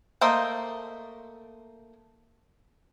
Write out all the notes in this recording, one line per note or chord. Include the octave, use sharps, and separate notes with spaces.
A3 A#3 C5 D#5